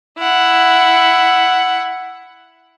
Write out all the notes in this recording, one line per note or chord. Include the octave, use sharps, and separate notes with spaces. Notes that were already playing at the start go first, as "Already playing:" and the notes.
E4 F#5